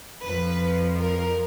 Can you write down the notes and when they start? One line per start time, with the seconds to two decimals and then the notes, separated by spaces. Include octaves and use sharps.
0.24 F2 F3 B4
0.99 A#4